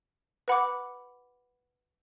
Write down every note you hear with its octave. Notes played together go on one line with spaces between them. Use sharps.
B4 F#5 B5 D6